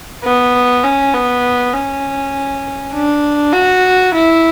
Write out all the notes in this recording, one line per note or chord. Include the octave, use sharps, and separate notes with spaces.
B3
C#4
B3
C#4
D4
F#4
E4